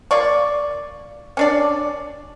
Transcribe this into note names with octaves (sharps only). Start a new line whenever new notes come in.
A#3 F4 D5 C#6
C#4 D4 D5